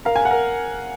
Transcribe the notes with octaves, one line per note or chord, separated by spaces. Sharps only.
A#4 F5
G#5
F#5
A#4